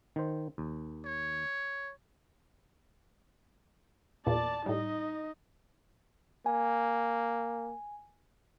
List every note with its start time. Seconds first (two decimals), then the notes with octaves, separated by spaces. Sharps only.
0.16 D#3 C5
0.58 D#2
1.05 C#5
4.26 E2 A#2 D5 A5
4.66 A2 G3 D#4 D#5
6.46 A#3 G#5